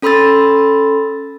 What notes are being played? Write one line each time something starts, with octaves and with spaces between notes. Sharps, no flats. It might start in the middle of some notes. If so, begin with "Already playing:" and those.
C#4 A4 B5 C6 E6 A6